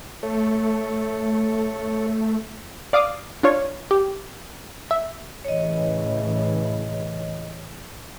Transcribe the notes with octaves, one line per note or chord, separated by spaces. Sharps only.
A3 A4 C#5
D5 F5 D6 D#6
D4 F4 C#5
G4
E5
A2 C#3 E3 C#5 D#5